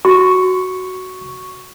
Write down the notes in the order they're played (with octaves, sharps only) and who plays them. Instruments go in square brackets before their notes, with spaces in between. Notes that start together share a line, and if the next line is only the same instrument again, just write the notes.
[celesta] F#4 [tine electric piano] C#6